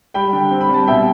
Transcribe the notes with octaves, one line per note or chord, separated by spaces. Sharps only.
G3 G5 B5
D3
C4
B5
G3 A5
B2 E5 G5